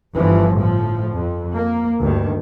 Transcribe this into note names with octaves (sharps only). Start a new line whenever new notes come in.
G1 E3 F3
A2 F3
F2
A#3
D2 G2 D#3